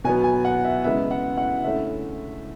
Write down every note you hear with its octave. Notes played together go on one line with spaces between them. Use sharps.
B2 F#3 B3 G#5
G#5
F#5
E5
C#3 G#3 B3 E4 E5
F#5
F#5
D3 A3 C#4 E4 E5